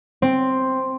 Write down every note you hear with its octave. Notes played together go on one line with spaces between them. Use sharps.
C4